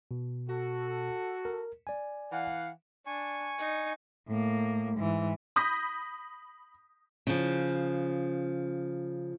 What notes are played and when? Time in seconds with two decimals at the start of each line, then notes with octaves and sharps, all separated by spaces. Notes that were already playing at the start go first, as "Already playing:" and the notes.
0.11 B2
0.49 F#4 A4
1.45 A#4
1.87 D5 G#5
2.32 E3 F5 F#5
3.06 D4 G#5 C#6
3.58 D#4
4.27 A2 A#3
4.97 G#2 E3
5.56 B5 D#6 G6 A#6 B6
7.27 C#3 F3